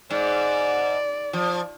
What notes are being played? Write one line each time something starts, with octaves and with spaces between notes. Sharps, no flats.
G#2 D5
F3